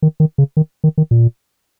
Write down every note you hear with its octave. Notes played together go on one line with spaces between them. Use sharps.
D#3
D#3
C#3
D#3
D#3
D#3
A#2